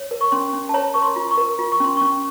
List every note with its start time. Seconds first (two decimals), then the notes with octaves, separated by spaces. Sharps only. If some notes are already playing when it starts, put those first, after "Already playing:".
Already playing: C#5
0.11 A#4
0.21 C#6
0.32 C#4 C6
0.53 C#4
0.69 A5
0.74 C#5 A#5
0.94 A#4 C#6
1.02 C6
1.16 F4
1.31 C#6
1.38 A#4
1.59 F4
1.72 C#6
1.80 C#4 C6
1.97 C#4 C#6